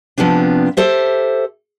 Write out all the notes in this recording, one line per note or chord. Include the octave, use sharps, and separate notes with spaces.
C3 F3 B3 C4 D4
G4 A4 C5 E5